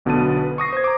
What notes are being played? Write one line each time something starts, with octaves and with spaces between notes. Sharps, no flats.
B1 B2 D3 B3 A5 D#7
B4
C#6 D#6 A#6 C7
C5 G#6
A#5 D6